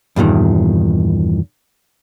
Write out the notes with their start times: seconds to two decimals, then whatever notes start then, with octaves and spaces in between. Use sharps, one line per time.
0.16 E2 G2 A#2 D#3